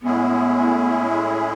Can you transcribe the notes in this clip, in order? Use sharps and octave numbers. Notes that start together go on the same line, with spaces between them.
A2 G#3 B3 C#4 E4 G#4